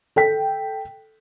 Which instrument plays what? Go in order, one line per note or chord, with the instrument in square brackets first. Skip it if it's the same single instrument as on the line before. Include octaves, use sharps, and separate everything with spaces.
[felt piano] A4 G5 B6